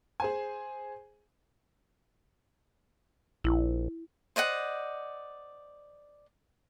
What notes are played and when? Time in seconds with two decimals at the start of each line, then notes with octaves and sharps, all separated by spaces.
0.20 G#4 C5 G#5
3.44 A#1 E4
4.36 C5 D5 D#5 F#5